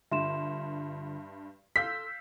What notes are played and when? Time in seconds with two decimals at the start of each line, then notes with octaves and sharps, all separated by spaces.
0.12 G2 D3 F4 E5 C6 E7
1.76 A4 F5 C6 E6 G6 B6